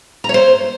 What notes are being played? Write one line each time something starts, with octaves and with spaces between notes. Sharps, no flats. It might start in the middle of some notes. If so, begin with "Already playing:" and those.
A#5
C#5
C5